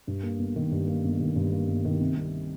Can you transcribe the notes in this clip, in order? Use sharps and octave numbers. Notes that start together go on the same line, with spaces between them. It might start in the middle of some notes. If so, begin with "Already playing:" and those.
G2
A#3
G1
D#3
G2
A#3
G1
D#3
G2
A#3
G1
D#3
C3
C2